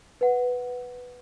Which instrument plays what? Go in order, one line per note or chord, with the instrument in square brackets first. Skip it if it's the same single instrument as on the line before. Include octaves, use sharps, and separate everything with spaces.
[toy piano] B4 F#5